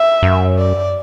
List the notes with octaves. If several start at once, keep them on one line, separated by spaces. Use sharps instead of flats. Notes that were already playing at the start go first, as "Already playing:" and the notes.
Already playing: E5
F#2
D5